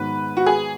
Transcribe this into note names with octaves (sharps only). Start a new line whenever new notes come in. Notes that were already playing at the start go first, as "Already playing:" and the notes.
Already playing: G#2 D#3 F#3 B3 B4
F#4
G#4